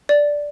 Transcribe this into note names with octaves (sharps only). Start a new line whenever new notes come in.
D5